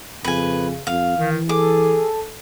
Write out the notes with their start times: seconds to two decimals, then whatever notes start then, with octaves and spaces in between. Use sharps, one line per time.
0.24 F2 C#3 B4 G#5
0.87 F2 F5
1.17 D#3 E3
1.49 G#4 A4 D6